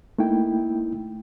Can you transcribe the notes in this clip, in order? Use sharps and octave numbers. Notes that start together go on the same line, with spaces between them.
A3 A#3 D#4 E4 G5